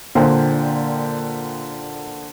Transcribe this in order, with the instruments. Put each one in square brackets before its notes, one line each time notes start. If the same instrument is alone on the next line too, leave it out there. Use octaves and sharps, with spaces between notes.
[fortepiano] A#2 [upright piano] D3 C5 G5